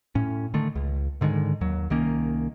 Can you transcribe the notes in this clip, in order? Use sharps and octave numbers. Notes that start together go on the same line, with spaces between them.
A2 C#4
D3 D#3 A3
C#2
G#2 D3 D#3 G#3
D#2 F#3
C2 D#3 A#3 C#4